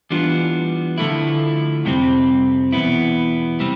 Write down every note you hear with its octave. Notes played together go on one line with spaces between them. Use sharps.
E3 G3 B3 D4 F4
D3 F3 A3 E4
F2 C3 G3 C4
E2 B2 B3 E4
C3 G3 C4